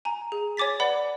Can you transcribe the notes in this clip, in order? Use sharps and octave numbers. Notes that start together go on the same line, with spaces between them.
G#5 A#5
G#4
C#5 G#5 D6 A6 B6
B4 D5 F#5 B5